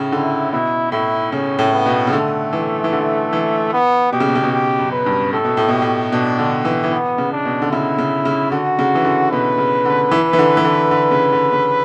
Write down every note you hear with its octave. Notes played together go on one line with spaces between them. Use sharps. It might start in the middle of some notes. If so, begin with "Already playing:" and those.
Already playing: A2 C#3
D3 E4
B2 E4
A2 E4
C#3 C#4
A2
B3
B2
C#3
D3 A3
E3
E3
D3
E3
B3
B2 G4
C#3
B2
C#3
B2
G4
F#2
B4
G2
A2 A4
B2
A2
B2 G4
A2
B2 D4
D3
E3
E3
B3
C#3
D4
B2
D3
C#3 E4
C#3
C#3
D3 F#4
C#3
E3
D3
B2 B4
C#3
D3
E3
E3
D3
E3
D3
D3
C#3
D3
C#3